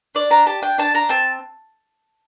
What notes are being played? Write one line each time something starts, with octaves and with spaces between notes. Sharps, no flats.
D4 D5
D4 A#5
G4 A5
D4 G5
D4 A5
D4 A#5
C4 A5